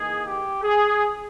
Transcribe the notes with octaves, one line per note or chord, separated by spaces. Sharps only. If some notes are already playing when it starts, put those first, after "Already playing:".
Already playing: E3 A#3 D#4 G#4
G4
G#4